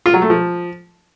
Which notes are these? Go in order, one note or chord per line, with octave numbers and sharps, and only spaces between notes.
F4
F#3
A3
F3